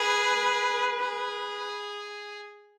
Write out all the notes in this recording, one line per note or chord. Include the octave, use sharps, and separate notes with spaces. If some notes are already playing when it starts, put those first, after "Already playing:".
Already playing: G#4 B4
G#4